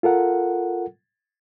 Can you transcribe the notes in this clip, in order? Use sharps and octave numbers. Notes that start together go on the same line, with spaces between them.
F4 A4 A#4 F#5